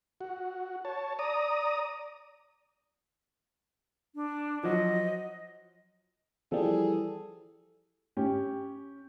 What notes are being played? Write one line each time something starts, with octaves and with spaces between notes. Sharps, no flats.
F#4
C#5 A5
D5 A#5 D#6
D4
F3 F#3 D#5
E3 F3 G3 G#4 A4
C#4 G4